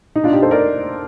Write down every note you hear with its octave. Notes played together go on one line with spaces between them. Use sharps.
D#4
D4 F4
D#4 G4
A4 C5
A#4 D5